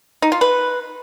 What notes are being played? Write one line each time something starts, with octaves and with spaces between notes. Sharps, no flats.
D#4
F4
B4